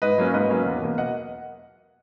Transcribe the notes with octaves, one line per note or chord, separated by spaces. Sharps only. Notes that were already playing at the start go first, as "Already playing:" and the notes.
G#2 B4 D#5
F#3 A#3 C#4
G#2 B4 D#5
F#3 A#3 C#4
E2
B2 A#3
D#5 F#5